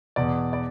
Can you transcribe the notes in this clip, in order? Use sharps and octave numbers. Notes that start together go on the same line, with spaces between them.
E2 B2 D5
D5